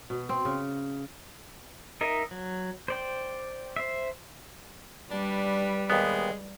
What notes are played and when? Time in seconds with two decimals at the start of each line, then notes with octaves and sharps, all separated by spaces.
0.10 B2
0.29 C4
0.45 C#3
2.01 D#4 A#4 D#5 E5
2.31 F#3
2.88 C5 D5 G5
3.76 C5 E5
5.11 G3 D4 B4
5.90 D#2 G#3 B3